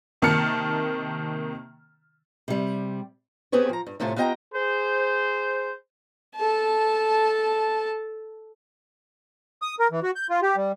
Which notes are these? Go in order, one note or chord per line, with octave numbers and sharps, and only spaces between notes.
C3 D#3 A#3 A5 F6 C#7
C3 G3
B3 C4 G4 G#4 B4 C#5
F3 A#5
G2
A2 C3 A3 C#4 F4
B3 F4 G4 D#5 G5 A#5
G#4 C5
A4 A5
D#6
A#4
E3
F#4
G6
F4
G4
G3